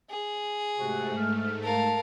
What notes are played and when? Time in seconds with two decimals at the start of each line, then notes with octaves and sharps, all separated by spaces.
0.10 G#4
0.78 G#2 C3 A3 F#4
1.16 E2 G#4 F6
1.63 A#4 F5 A5